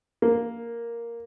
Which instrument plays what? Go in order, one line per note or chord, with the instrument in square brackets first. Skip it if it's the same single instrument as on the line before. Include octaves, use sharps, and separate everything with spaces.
[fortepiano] A#3